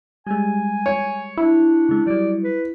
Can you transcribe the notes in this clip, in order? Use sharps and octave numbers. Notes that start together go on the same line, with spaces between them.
G3 G#3 G#5
C#5
D4 E4
C#3 G#3
F#3 G3 D5
B4